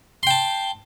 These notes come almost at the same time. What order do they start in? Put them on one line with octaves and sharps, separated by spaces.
C6 G5 A5